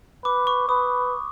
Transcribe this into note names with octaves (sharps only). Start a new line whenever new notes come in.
B4 D6
C#6
B4 D#6